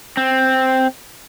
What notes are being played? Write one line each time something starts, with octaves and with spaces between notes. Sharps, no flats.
C4